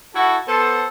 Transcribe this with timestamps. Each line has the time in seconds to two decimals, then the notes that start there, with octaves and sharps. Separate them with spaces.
0.15 E4 F#4 A4
0.48 B3 A4 C5